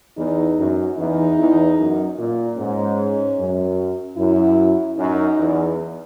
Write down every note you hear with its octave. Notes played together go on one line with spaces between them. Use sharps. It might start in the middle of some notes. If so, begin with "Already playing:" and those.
E2 D#4
F#2
E2 D#4
E2
F#2
A#2
G#2 C#4
F#2
F#2 E4
F#2 D#4
E2